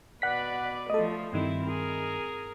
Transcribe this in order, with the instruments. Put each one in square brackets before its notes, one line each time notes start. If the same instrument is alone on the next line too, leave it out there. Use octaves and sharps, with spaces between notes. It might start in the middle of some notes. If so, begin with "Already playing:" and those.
[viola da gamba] B2 B4 D5 [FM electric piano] F#5 B6
[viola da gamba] F3 A3 [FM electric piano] A4 D#5
[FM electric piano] G2 D#3 [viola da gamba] C4 E4
[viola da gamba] G#4 A#4